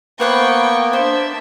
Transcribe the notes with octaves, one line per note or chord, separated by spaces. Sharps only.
A#3 B3 B4 C5 F#5 G5 C#6
D4 C5 E5